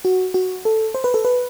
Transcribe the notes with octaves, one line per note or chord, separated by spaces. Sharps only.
F#4
F#4
A4
C5
B4
A4
B4